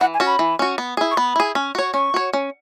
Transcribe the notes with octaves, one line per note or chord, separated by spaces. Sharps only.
E3 F#5
G#5
C#4 F#4
B5
E3
C#4 F#4
B3
E4 G#4
C#6
B3 B5
E4 G#4
C#4
F#4 C#5
C#4 C#6
F#4 C#5
C#4